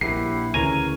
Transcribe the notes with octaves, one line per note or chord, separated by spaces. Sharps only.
A#1 E4 G4 F#5 C7
D2 C#3 E3 A#4 C#5 G#5 A#5